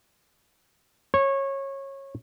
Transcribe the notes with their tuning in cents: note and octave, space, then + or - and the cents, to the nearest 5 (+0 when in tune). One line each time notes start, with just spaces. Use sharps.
C#5 -20